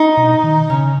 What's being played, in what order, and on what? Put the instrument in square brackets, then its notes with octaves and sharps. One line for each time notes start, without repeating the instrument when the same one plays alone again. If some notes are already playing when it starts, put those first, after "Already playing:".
Already playing: [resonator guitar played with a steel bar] D#4
[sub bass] B2
D#3
[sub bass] C#3 [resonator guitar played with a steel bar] C#4